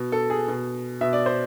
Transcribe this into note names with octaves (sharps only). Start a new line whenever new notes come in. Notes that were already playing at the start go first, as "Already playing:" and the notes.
Already playing: B2
A4
G#4
B2
B2 E5
D5
C5